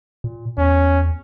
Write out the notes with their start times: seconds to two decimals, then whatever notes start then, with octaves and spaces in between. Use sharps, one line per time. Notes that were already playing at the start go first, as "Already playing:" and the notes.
0.24 A#2
0.58 E2 C#4